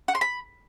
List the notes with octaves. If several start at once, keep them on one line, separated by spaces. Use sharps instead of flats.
F#5
C6
B5